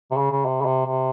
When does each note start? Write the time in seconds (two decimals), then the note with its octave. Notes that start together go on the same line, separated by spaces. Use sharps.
0.11 C3
0.17 C#3
0.31 C#3
0.45 C3
0.61 C#3
0.66 C3
0.86 C3